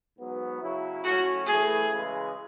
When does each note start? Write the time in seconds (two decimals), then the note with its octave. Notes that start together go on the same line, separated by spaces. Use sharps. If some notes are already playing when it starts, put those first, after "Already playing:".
0.18 G#2 F#3 B3
0.61 C#3 F#3 C#4 E4
1.04 A2 F#3 C#4 F#4
1.46 A2 E3 A3 E4 G#4
1.89 C#3 E3 G#3